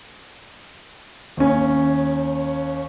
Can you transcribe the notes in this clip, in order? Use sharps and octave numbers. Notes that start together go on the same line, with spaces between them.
D#2 C#4